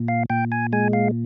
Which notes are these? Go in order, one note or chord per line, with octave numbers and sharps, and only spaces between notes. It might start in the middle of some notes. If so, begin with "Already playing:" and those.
Already playing: A#2
F5
A#2 G5
G#5
G#3 G#5
F5